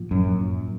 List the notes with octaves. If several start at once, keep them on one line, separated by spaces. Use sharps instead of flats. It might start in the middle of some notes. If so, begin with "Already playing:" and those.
Already playing: A2 F3 A#3 F4
F#2